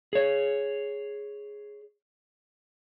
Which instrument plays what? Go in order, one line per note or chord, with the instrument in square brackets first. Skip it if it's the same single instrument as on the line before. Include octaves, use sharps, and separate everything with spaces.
[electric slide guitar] G#4 C#5